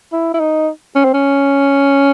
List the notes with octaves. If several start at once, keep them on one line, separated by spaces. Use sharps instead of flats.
E4
E4
D#4
C#4
C4
C#4